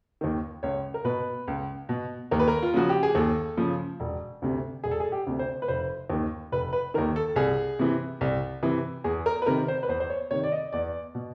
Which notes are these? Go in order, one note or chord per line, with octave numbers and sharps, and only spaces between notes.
D#2 D#3
C#2 C#5
A#4
B2 B4
C#2
B2
D#2 A#4
B4
A#4
F4
C#3 F3 F#4
G4
G#4
D#2 A4
C#3 F3
E1
D2 C3
E1 G#4
A4
G#4
G4
D2 C3
C5
B4
F1 C5
D#2 D#3
F1 B4
B4
D#2 D#3 A#4
A4
C2 G#4
C3 E3
C2
C3 E3
E2 G#4
A#4
B4
C3 D#3 A#4
C5
B4
E2 C5
C5
C#5
C3 D#3 C#5
D5
D#5
E2 D5
B2